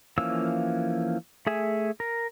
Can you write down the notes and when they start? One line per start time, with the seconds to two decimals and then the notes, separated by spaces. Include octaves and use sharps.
0.18 E3 F3 A#3 C#4 E6
1.47 A3 G#4 E5 G#5
2.00 A#4